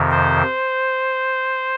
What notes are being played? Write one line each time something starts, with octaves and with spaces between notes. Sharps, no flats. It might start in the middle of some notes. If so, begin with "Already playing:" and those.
Already playing: F2 C3 D#3
C5